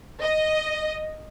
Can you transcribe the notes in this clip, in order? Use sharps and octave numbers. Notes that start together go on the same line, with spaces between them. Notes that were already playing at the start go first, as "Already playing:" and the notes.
D#5